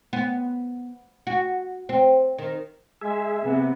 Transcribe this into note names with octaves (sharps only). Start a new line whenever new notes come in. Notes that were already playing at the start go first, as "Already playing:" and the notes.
B3
F#4
C4
D#3
G#3 G#4 E5
C3 B3